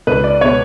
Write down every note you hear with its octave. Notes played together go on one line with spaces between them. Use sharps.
C#2 B4
D5
B2 G#3 B3 C#5